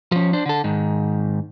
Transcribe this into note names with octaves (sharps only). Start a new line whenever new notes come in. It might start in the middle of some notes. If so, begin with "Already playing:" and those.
F3 C#4
D4 C5
D3 A4
G#2 D#3